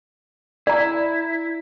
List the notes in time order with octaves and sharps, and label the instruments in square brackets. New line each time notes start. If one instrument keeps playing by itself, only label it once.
[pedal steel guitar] E4 [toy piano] D5 A#5